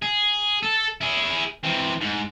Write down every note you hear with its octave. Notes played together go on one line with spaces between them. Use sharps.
G#4
A4
E4 G#4
E3 C4
G#2